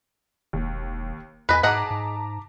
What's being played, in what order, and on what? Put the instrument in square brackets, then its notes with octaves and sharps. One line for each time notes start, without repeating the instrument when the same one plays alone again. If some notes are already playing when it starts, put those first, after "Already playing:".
[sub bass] E1 [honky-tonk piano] D#2
[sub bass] E2 [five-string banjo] B4 D#5 [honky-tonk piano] G#5 B6
[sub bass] G#2 [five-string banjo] G#4 D#5 F#5 [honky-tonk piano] A5 A#5 D6
[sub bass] G#2